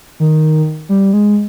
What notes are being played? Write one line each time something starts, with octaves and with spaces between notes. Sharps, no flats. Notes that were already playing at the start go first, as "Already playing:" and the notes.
D#3
G3
G#3